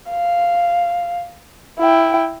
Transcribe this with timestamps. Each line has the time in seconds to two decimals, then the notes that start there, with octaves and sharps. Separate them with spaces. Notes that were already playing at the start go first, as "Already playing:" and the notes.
0.11 F5
1.79 E4 G5